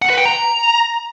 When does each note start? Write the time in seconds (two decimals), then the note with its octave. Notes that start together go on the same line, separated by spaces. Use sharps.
0.02 F#5
0.10 B4
0.18 G5
0.25 A#5